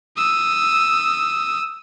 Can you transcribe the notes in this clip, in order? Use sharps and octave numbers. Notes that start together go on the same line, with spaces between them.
D#6 E6